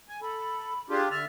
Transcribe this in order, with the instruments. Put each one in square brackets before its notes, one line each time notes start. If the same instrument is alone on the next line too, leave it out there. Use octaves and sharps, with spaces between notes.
[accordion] G#5
[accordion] A4 [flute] B5
[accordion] D4 F4 G4 [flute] G#4
[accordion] D3 E5 F6 [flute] A6